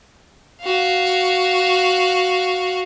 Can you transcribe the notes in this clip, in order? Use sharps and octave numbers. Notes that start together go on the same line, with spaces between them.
F#4 F5